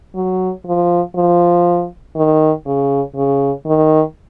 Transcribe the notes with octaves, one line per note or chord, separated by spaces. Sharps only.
F#3
F3
F3
D#3
C#3
C#3
D#3